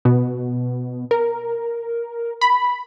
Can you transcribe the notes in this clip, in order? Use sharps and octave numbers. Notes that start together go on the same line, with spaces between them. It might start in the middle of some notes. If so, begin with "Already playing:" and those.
B2
A#4
B5